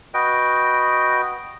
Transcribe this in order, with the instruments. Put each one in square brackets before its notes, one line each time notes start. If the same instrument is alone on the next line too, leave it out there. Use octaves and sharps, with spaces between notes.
[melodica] F#4 B4 D#5 G5